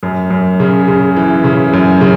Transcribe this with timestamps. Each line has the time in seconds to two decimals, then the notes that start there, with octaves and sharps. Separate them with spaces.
0.03 F#2
0.30 F#2
0.60 C#3
0.88 C#3
1.16 E3
1.44 C#3
1.73 F#2
2.01 C#3